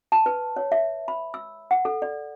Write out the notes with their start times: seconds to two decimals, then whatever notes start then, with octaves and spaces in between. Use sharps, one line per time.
0.12 A5
0.26 B4
0.56 C#5
0.72 E5
1.08 B5
1.34 E6
1.71 F#5
1.85 A4
2.02 D5